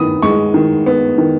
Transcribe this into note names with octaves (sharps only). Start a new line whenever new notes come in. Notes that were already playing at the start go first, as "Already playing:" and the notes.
Already playing: D#3 B3 B5 D#6
G#3 C#6
D#3
B3
D#3